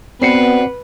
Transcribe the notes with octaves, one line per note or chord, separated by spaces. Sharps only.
B3 C4 F#4 B4 D5 C7 C#7